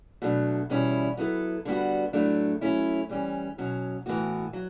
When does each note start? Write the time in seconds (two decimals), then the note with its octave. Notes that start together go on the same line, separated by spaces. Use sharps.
0.22 B2 F#3 A3 D4
0.70 E2 B2 G3 C#4 E4
1.17 F#3 B3 E4 A4
1.65 D3 G3 B3 F#4
2.13 A2 F#3 A3 D4
2.61 F#3 A3 C#4 E4
3.09 E3 G3 C#4
3.58 B2 F#3 C#4
4.06 A2 E3 B3 F#4
4.53 F#3